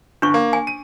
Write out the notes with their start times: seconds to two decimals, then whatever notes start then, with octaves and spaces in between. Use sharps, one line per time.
0.22 G1 D4 C#6
0.34 A#3
0.53 G#5
0.67 D#7